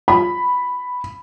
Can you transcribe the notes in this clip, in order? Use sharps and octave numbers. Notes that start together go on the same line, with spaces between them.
B5